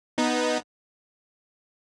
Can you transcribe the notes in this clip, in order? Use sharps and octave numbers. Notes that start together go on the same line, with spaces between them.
B3 D#4